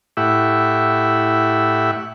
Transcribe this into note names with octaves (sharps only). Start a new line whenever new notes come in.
A2 E4 G4 E5 F#5